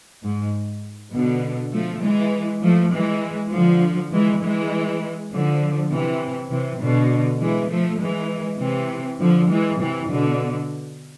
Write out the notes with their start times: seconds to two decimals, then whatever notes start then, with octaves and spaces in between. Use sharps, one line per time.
0.24 G#2
1.13 B2 D3
1.73 F3 A3
2.02 E3 G#3
2.62 F3 A3
2.92 E3 G#3
3.52 D3 F3
4.11 E3 G#3
4.41 E3 G#3
5.31 D3 F3
5.91 C3 E3
6.51 C3 E3
6.80 B2 D3
7.40 E3 G#3
7.70 F3 A3
8.00 E3 G#3
8.60 C3 E3
9.19 D3 F3
9.49 E3 G#3
9.79 C3 E3
10.09 B2 D3